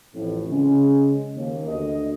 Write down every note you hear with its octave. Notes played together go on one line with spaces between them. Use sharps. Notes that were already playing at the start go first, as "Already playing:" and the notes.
A1 F2 A2
C#3 G#3
D#2
D2 D#5